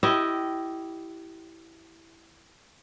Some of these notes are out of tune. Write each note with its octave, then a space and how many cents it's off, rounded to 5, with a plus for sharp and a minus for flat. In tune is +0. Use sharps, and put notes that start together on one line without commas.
E4 +0 G4 -20 D#5 +0